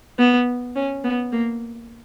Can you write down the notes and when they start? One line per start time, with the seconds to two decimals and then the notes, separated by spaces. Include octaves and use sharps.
0.19 B3
0.76 C#4
1.04 B3
1.32 A#3